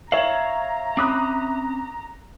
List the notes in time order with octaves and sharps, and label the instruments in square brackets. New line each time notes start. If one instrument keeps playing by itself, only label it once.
[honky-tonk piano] C#5 E7 F#7 [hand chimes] E5 [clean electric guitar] F5 [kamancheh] A#5
[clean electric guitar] C4 C#4 B5 [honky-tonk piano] D6 D#6 F#6